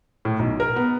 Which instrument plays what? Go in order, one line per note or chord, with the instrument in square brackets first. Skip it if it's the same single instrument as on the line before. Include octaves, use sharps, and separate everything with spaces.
[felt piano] A2
B1
A#4
B3